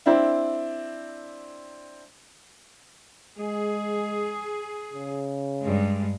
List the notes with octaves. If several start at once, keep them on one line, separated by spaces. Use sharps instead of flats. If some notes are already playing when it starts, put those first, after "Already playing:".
C4 D4 E4
G#3 G#4
C#3
G2 G#3